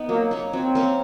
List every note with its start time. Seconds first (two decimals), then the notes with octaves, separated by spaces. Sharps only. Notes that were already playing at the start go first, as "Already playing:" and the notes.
Already playing: B3 D#4
0.09 F#3 A#3
0.31 A#3 C#4
0.53 F#3 C4
0.75 A#3 C#4